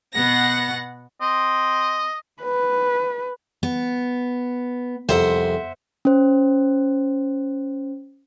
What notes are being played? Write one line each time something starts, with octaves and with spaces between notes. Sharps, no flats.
B2 B3 F#5 A#6
C4 D#5
B4
B3
C2 F2 C5 E5 F#5
C#4 C5